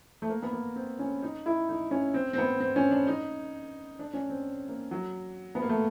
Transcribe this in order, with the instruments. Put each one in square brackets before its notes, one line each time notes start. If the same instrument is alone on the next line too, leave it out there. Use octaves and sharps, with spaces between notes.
[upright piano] A3
A#3
B3
A#3
C4
C#4
D#4
E4
D#4
C#4
C4
C4
B3
C4
C#4
D4
D#4
D4
C#4
C4
A#3
F#3
B3
A#3
A3